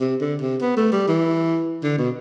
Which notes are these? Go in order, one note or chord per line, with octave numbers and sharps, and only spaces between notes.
C3
D3
C3
B3
A3
G3
E3
D3
B2